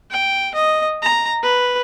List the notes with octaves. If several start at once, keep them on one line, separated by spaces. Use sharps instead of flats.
G5
D#5
A#5
B4